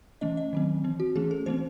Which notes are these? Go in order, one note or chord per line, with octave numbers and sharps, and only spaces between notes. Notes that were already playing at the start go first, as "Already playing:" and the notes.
E3 A3 C#4 D#5
D#5
D#3 F#3 C4
E3 C4
F#4
E3 A3 C#4 G#4
A4
E3 A3 C4 C5